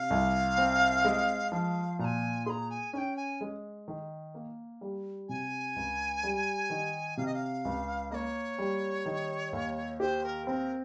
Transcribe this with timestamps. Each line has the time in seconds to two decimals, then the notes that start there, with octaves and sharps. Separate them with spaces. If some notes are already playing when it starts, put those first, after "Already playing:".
Already playing: C3 F5
0.10 C2
0.58 C4
1.05 G#3
1.52 F3 F5
1.99 A#2 A#5
2.04 G#5
2.46 G#4 A#5 C6
2.70 G#5
2.93 C#4 G5 G#5
3.16 G#5
3.41 G#3
3.88 D#3
4.34 A#3
4.81 G3
5.29 C3 G#5
5.76 C#2
6.23 G3
6.70 D#3
7.17 C3 F5
7.26 D#5
7.34 F5
7.65 C#2
8.11 A#3 C#5 D#5
8.59 G3
9.06 D#3
9.53 D#2
10.00 G4 C5
10.24 A#4
10.47 C4 A#4